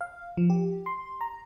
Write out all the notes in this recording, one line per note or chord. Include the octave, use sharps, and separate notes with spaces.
F5
F3
G4
C6
A#5